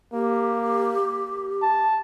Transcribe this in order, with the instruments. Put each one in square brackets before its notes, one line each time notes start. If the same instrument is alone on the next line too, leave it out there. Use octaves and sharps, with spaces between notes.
[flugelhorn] A#3 [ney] G4
[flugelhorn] A5